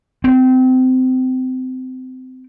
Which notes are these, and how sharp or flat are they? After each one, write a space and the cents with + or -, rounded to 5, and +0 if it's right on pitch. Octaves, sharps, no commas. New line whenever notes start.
C4 -25